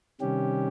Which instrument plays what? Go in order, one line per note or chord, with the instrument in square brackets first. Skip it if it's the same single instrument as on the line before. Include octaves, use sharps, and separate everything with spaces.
[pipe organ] C3 D#3 G3 C#4 G4